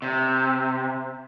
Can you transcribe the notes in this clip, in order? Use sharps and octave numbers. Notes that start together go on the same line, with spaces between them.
C3